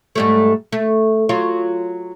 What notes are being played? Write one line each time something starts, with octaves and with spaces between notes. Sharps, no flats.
G#2 G3 A3
A3
F#3 F4